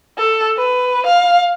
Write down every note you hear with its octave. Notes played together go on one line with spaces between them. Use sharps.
A4
B4
F5